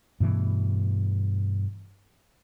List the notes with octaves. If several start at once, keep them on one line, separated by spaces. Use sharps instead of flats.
G2 B2 E3 A3